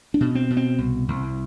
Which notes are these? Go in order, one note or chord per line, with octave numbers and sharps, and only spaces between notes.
D4
B2
C4
B2
C4
C2
C2